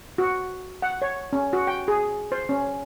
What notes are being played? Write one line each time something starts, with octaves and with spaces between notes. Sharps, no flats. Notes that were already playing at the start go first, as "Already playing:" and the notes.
F#4
F#5
C#5
C#4
F#4
G5
G#4
C5
C#4